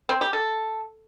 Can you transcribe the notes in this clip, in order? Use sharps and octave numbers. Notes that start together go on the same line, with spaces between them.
C4
G4
A4